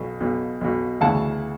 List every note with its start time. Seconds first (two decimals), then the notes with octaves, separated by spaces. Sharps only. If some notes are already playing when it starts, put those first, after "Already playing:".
Already playing: B1 B2
0.20 B1 B2
0.61 B1 B2
1.01 D2 C#3 E3 F#5 A5